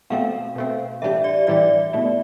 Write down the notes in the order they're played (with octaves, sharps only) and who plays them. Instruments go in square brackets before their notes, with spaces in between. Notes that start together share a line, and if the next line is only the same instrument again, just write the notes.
[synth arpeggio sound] B2 A3 C4 [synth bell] F5
[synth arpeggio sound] B2 A3 C4
[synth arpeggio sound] A2 E3 G3 D4 G4 [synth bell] E5
[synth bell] D5
[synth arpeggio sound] A2 E3 G3 D4 G4 [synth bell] D5
[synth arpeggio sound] B2 A3 E4